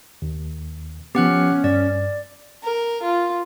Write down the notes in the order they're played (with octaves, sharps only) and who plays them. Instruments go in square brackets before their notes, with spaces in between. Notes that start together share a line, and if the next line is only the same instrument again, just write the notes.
[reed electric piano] D#2
[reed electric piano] F3 B3 [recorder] C#4 [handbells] G4 F#5 F#6
[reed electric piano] G2 [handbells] D5
[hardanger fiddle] A#4
F4